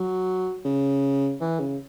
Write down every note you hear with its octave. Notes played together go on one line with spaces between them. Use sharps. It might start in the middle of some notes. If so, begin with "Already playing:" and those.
Already playing: F#3
C#3
E3
C#3